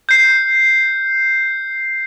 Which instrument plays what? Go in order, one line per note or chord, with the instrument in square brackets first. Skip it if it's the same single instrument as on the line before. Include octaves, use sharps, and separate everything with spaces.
[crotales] G6 C7